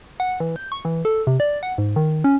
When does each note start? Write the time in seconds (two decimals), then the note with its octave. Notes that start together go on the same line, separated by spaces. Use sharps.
0.20 F#5
0.40 E3
0.56 G6
0.72 C#6
0.85 E3
1.05 A4
1.27 C3
1.40 D5
1.63 F#5
1.78 G#2
1.96 D#3
2.24 C#4